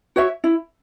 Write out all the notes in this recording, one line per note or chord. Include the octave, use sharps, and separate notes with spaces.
F#4 C#5 E5
E4